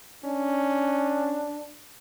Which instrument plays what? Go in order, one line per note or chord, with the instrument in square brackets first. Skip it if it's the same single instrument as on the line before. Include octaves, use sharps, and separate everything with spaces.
[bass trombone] C#4 [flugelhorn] D4